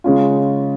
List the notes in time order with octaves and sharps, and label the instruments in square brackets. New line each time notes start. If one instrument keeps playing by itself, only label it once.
[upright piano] C#3 G#3 C#4 F4